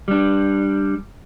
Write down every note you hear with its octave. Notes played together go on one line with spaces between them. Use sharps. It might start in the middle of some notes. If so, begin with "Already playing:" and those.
G3 D4